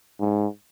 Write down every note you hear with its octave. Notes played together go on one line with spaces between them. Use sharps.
G#2